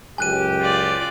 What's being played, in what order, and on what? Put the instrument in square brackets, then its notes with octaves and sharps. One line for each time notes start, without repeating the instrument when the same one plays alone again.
[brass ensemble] C#2 F#2 G4 [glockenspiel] G#5 F#6 D#7
[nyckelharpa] F4 D5